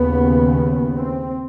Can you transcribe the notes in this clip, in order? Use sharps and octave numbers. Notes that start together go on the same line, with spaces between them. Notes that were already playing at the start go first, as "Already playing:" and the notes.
Already playing: D#2 C#3 B3
C4